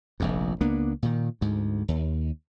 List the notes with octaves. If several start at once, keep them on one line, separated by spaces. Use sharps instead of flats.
F1 A#1 F2
C#2 A#3 B3 D4
A#2 D#3
D2 G#2
D#2